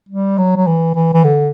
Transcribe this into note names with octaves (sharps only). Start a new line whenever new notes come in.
G3
F#3
F#3
E3
E3
E3
D3